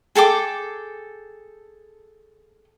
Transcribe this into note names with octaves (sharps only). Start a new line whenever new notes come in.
G#4 A4 G5 D6